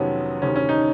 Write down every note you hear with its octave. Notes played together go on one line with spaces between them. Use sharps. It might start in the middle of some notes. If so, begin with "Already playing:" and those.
Already playing: F2 C3 D#3 F#3 B3 C#4
D2 C3 D#3 C#4
C#4
D#4